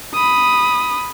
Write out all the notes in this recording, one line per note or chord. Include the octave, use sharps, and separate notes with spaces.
B5 D#6